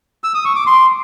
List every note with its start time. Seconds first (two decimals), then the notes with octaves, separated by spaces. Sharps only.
0.24 E6
0.34 D#6
0.45 C#6
0.56 D6
0.66 C6